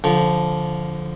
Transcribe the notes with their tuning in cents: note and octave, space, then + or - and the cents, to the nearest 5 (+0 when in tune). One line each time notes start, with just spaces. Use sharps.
D3 -15 F3 +0